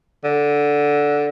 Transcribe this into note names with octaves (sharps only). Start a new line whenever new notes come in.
D3